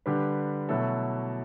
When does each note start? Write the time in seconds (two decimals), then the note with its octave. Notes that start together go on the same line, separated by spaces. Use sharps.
0.06 D3 G3 D4 G4 B4
0.69 B2 F#3 A3 E4 A4